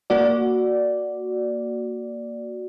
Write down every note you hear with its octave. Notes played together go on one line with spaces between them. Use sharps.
A#3 F#4 D5